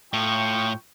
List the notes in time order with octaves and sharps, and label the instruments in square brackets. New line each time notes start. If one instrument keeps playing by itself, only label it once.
[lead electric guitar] A2 [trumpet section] F4 G5 C#6